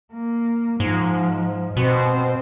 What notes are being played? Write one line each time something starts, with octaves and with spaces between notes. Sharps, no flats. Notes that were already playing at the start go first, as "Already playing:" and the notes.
A#3
G#2 F3
B2 C4 C5